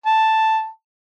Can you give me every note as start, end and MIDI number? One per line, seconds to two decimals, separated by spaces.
0.06 0.68 81